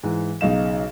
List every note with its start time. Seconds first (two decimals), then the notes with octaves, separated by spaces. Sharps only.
0.03 G#2 E3
0.41 B1 C#3 D#4 F5 E7